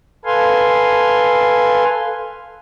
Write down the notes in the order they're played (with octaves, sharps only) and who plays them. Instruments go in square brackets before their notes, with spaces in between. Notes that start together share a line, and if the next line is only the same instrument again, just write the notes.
[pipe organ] A4 B4 F5 G#5 C6